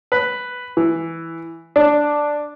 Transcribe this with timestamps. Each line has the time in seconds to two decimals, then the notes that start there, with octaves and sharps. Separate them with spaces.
0.12 B4
0.77 E3
1.76 D4